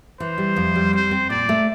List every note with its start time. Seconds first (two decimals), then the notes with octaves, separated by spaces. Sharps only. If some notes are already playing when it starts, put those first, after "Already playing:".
0.20 E3 C5
0.38 G3
0.56 F2
0.75 G3
0.93 C4 C5
1.11 C4
1.30 A#2 D5
1.49 A3